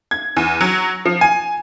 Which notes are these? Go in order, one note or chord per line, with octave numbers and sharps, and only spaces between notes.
G#6
E2
F#3
F3
G#5